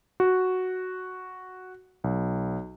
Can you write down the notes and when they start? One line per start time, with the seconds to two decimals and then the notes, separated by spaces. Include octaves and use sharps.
0.20 F#4
2.04 B1